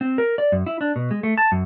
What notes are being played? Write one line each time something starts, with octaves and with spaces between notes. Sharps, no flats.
C4
A#4
D5
F#2
E4
D4
B2
G#3
A3
A5
F#2